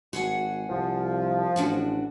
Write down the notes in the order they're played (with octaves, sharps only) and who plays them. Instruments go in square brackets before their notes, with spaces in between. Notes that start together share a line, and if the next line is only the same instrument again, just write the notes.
[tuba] G#1 [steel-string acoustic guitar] F#4 G#4 F#5
[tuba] C2 [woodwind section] F3
[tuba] A1 [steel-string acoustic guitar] E3 D4 F#4